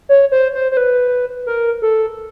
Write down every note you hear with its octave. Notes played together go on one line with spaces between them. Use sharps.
C#5
C5
C5
C5
B4
A#4
A4